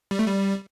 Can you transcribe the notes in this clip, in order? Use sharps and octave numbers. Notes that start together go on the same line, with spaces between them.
G3
A3
G3